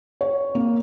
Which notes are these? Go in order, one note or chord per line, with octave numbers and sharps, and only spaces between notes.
C#5
A#3